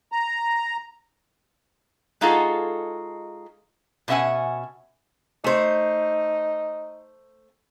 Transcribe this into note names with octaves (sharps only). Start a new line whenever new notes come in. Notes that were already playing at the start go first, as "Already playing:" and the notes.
A#5
G#3 D#4 F4 F#4 G#4 A4
B2 C#4 E5 F#5 G#5
A3 D#4 C5